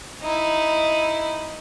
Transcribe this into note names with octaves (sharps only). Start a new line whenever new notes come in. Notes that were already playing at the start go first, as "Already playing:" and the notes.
D#4 E4